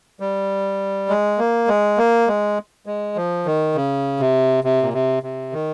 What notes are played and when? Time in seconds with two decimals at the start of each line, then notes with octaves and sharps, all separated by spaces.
0.20 G3
1.09 G#3
1.38 A#3
1.68 G#3
1.98 A#3
2.27 G#3
2.86 G#3
3.16 F3
3.46 D#3
3.75 C#3
4.20 C3
4.64 C3
4.82 A#2
4.93 C3
5.23 C3
5.53 D#3